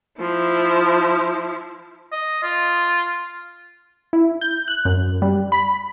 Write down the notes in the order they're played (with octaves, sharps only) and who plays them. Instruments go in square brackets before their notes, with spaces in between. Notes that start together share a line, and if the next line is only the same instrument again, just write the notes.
[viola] F3 E4
[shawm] D#5
F4
[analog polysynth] E4
G6
F#6
F#2
G3
B5